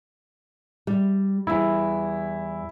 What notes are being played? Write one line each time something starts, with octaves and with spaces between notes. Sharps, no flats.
G3
E2 G3 E4